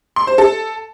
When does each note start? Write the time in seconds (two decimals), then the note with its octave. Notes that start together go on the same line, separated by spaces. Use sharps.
0.16 C6
0.27 C5
0.38 A4